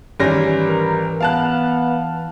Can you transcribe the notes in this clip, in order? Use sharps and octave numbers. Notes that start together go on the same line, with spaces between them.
G#1 E3 G3 C#4 A#6
A#4
B3 F5 A5 F#6